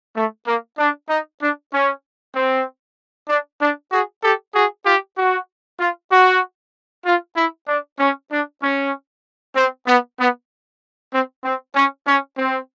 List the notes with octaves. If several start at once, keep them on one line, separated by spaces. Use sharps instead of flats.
A3
A#3
D4
D#4
D4
C#4
C4
D4
D4
F#4 G#4
G4 A4
F#4 G#4
F4 G4
F#4
F4
F#4
F4
E4
D4
C#4
D4
C#4
C4
B3
B3
C4
C4
C#4
C#4
C4